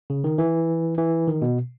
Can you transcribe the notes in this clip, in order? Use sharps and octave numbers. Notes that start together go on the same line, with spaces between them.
C#3
D#3
E3
E3
D#3
B2